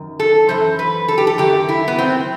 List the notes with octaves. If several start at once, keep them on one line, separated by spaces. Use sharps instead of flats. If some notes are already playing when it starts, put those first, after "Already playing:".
Already playing: F#2 D#3
A4
F#2 E3 C5
B4
A4
G4
A4
F#2 D#3 G4
E4
B3
C4